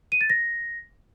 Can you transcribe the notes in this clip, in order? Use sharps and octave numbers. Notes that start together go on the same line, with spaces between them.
D#7
A6
A#6